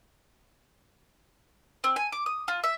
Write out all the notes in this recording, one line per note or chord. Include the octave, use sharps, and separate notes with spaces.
C4
G#5
D6
D#6
F4
E5